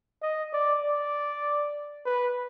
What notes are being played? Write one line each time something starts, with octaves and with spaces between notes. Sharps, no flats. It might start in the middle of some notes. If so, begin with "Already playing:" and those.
D#5
D5
D5
B4